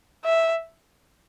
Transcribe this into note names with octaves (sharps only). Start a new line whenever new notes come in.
E5